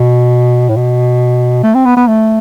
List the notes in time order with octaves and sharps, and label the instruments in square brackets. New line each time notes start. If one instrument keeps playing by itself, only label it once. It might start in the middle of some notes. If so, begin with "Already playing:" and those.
Already playing: [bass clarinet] B2
A2
B2
A3
C4
B3
B3
A3